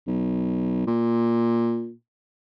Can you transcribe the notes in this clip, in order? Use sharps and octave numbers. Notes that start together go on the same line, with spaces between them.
B1
A#2